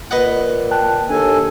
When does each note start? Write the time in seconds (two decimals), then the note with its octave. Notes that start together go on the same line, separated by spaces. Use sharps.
0.11 A#2 B4 D#5 F#5
0.71 G5 A5 F#6
1.09 D#2 D4 A4 G#5